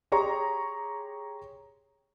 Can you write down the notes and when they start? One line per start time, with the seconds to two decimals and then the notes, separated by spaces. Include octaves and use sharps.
0.12 G4 G#4 C#5 A#5 C6 C#6